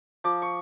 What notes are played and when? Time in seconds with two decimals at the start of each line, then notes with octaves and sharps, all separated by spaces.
0.24 F3 D6
0.42 C#6